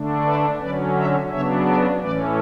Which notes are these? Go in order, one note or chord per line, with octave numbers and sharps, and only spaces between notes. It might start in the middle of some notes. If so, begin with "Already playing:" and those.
Already playing: D3 A3 D4
B4 D5
D3 F#3 C#4 B4 D5
C#5 E5
C#3 F#3 B3 D4 C#5 E5
B4 D5
A2 E3 A3 C#4 B4 D5